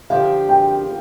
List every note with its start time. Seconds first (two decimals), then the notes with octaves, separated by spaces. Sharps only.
0.10 D3 F3 D4 G4 F5
0.49 G5